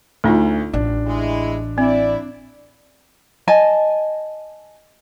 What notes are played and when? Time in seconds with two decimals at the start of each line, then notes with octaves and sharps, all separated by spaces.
0.24 D2 A3 D#4 F4
0.73 A1 D4
1.06 G#3 E4
1.78 C4 E4 D5
3.48 D#5 G#5 A5